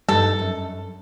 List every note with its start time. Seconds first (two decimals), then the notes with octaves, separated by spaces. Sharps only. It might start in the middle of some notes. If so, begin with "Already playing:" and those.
0.09 G2 G3 D#4 A4
0.39 F#2